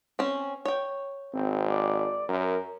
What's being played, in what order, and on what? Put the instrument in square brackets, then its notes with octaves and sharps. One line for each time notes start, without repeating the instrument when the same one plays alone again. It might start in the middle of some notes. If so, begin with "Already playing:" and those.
[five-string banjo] C4 C#4
C#5 G5
[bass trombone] G#1 [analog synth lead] C4
[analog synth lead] D5
[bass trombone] F#2 [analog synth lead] A#4